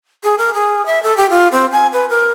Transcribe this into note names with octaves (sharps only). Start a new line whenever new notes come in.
G#4
A#4
G#4
E5
A4
G4
F4
C4
G#5
B4
A#4